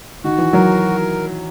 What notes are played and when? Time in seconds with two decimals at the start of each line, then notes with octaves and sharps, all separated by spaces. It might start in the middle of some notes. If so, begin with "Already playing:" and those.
0.24 D#3 F#4
0.38 E3
0.53 F#3 A#4